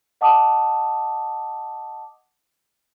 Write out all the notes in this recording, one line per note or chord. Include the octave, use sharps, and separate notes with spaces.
D#5 F#5 A5 D6 D#6